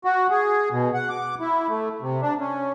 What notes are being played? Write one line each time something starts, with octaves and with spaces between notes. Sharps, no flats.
F#4
G#4
B2
F#5
D6
E4
A3
C3
D4
C#4